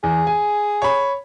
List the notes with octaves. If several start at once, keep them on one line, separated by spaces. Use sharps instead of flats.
E2 G#4
G#5
C#5 B5